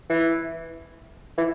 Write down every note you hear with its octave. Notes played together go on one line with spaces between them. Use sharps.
E3
E3